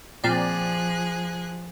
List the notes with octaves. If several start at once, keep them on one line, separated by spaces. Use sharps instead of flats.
A#2 F3 C4 G#4 D5 F#6